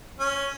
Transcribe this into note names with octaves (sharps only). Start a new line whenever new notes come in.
C#4